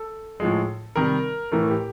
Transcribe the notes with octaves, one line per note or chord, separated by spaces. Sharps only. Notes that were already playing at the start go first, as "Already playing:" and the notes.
Already playing: A4
A2 F3 G#3
C3 D#3 G3 A#4
A2 E3 A3 A#4
G4